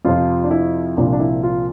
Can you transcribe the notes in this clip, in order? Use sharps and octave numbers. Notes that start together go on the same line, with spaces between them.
F2 C3 F3 F4
D4
E4
C2 A#2 F3 D4
D4
E4
F4